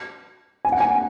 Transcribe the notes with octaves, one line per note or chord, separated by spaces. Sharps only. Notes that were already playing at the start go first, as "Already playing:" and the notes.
G#5
F#5
G#5